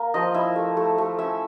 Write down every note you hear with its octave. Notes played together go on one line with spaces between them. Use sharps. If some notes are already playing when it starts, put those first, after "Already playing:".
Already playing: A#3
F3 D#5
E4 E5
A3
A3
A3
C#4 E5